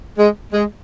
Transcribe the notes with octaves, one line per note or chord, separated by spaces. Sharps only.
G#3
G#3